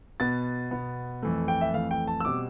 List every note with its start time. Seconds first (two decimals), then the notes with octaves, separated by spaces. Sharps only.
0.20 B2 B3 A6
0.71 B2 B3
1.23 F2 E3 A3
1.48 G5
1.61 E5
1.73 F2 E3 A3 F5
1.91 G5
2.07 A5
2.20 E6
2.25 B2 G3 C4 D6